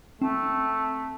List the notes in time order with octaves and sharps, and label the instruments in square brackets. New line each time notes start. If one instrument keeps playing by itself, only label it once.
[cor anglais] A3 [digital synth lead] C4